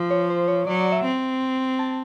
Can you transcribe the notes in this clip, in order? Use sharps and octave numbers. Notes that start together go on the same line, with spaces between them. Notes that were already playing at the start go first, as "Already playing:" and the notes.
Already playing: F3
C#5
C5
C#5
F#3 D5
D5
E5
C4
A5